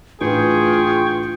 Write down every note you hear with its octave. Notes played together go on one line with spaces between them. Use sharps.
A1 D4 F4 G#4 B4 G5 C#6